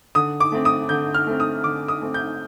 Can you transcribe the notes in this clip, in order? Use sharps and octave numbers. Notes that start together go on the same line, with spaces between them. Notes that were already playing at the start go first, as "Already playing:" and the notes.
D3 D#6
D6
A3 C4
D#6
D3 G6
F6
A3 C4
D#6
D3 D6
D#6
A3 C4
G6